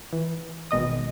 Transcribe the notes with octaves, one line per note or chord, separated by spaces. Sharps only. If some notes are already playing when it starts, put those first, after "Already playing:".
E3
G#1 B2 D#5 D#6